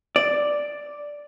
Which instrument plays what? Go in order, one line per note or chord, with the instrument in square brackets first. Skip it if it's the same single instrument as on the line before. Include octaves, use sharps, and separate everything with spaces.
[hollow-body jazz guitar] D5